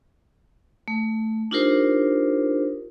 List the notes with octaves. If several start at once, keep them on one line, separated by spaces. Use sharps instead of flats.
A3
D4 D#4 F4 G4 A#4 C5